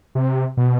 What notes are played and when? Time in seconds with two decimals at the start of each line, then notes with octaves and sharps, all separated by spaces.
0.15 C3
0.57 B2